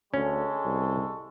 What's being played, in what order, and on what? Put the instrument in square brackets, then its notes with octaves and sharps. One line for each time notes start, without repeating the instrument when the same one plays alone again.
[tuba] D2 [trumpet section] G#3 A4 C#6 [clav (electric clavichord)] C#4
[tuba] C2